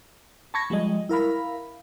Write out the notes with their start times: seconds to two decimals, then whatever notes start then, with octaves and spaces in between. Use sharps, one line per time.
0.54 A5 B5 C#6 G#6 A#6
0.70 F3 G3 G#3 D#5
1.09 E4 A#4 F5 B5